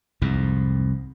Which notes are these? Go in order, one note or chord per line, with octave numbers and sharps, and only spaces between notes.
C2 F2 G#2